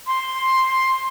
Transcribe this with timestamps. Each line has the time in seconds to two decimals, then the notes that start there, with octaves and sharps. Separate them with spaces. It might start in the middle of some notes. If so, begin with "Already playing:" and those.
0.07 C6